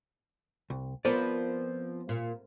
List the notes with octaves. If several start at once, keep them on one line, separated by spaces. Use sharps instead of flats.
C2
F3 B3 C4 A#4 B4 D5
A#2